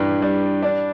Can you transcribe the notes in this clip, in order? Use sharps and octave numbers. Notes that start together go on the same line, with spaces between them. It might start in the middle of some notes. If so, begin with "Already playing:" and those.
Already playing: G2 E3
G3
D4